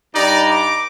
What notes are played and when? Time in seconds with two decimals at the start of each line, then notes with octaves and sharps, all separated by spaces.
0.15 G2 D#4 D5 A#5
0.51 D6